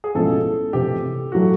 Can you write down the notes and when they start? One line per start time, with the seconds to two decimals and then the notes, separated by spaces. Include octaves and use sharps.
0.04 G#4
0.15 B1 A2 F3 G#3 C#4 A4
0.73 F1 F2 C3 E3 A3 G4
1.32 A2 F#3 A3 F#4